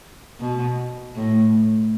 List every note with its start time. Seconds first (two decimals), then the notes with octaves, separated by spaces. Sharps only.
0.40 B2
1.16 A2